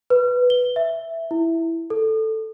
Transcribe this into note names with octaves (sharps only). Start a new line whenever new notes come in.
B4
G7
E5
E4
A4